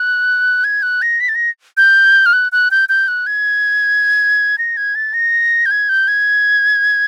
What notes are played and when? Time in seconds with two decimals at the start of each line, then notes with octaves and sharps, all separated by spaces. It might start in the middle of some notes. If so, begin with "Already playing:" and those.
Already playing: F#6
0.64 G#6
0.82 F#6
1.02 A#6
1.20 B6
1.29 A6
1.35 A#6
1.77 G6
2.26 F6
2.33 F#6
2.52 F#6
2.71 G6
2.89 G6
3.08 F#6
3.26 G#6
4.58 A#6
4.77 G#6
4.95 A6
5.14 A#6
5.66 G6
5.71 G#6
5.89 G6
6.08 G#6